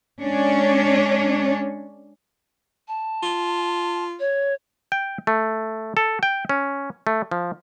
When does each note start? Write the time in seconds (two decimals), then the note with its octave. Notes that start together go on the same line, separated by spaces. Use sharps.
0.22 G#3 C#4 D4 C#5
2.88 A5
3.23 F4
4.19 C#5
4.92 G5
5.27 A3
5.97 A4
6.23 G5
6.49 C#4
7.07 A3
7.31 F3